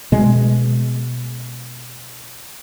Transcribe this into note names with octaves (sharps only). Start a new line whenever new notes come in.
B2 G#3